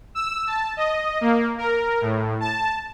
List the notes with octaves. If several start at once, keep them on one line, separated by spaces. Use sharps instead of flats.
E6
A5
D#5
A#3
A#4
A2
A5